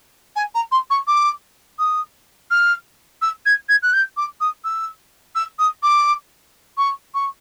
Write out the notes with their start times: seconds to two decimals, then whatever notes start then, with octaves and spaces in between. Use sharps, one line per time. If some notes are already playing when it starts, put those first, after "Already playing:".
0.36 G#5
0.55 A#5
0.72 C6
0.90 C#6
1.07 D6
1.79 D#6
2.51 F6
3.22 E6
3.46 G#6
3.69 G#6
3.83 F#6
3.93 G6
4.17 D6
4.41 D#6
4.65 E6
5.35 E6
5.59 D#6
5.83 D6
6.78 C#6
7.14 C#6